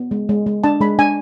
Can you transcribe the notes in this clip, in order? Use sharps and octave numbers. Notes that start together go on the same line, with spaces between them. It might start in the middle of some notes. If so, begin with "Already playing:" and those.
Already playing: B3
G#3
G#3
G#3
D4 A5
G#3 B5
D4 G#5